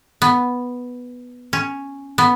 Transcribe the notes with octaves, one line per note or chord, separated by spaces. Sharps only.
B3
C#4
B3